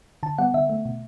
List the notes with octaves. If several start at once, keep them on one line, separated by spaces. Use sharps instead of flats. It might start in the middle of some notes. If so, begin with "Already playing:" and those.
D3 A5
G3 B3 F#5
D3 E5
A3
B2